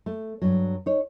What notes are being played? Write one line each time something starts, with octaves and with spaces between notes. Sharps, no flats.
A3
G2 F#3
D#4 C#5